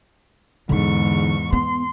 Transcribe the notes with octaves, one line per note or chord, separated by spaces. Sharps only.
E2 G#2 D3 D#4 C#6
B3 C6